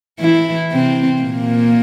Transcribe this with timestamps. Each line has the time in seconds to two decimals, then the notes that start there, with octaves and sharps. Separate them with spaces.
0.20 E3 E4
0.71 C3 C4
1.22 A#2 A#3